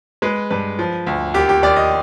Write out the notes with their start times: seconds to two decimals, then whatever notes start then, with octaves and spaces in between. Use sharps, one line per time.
0.22 G#3 B4
0.51 G2 B4
0.79 F3
1.07 D2
1.34 D#2 G4
1.49 G4
1.63 D#2 D5
1.76 D#5